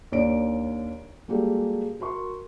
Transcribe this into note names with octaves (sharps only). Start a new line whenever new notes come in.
D#2 D4 C#5 D5 D7
G3 G#3 A#3 F#4 G4 A4
F#4 A#4 C6 C#6